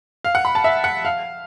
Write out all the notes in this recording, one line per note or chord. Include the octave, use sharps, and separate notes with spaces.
F5
F#5
B5
A5
E5
F#5
F5